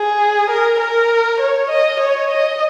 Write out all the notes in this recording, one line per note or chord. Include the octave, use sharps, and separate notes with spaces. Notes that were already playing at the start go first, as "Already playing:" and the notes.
Already playing: G#4
A#4
A#4
C#5
D#5
C#5
D#5